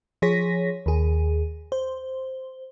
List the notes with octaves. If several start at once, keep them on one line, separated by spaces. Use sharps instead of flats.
F3 G#4 C#5 A#6 B6
D#2 G#4
C5